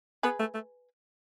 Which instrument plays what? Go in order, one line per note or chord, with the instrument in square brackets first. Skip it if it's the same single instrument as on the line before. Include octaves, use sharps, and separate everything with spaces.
[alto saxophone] B3 [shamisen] G#4 B4
[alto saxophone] A3
A3